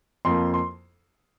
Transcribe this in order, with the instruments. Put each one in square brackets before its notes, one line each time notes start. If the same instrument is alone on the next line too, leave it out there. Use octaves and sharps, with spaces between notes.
[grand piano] F2 F3 A#3 C6
C6